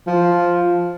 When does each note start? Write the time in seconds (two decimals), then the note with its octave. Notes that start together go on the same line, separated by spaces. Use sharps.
0.07 F3